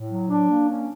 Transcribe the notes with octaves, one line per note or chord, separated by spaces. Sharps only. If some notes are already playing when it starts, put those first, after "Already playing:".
Already playing: A2
F#3
D4
A#3
C#4